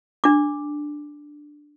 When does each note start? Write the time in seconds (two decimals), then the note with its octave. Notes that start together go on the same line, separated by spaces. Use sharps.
0.24 D4 D6